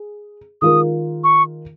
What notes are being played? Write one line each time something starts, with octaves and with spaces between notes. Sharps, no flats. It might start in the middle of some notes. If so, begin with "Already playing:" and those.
Already playing: G#4
D#3 G#3 F4 A#4 D#6
C#6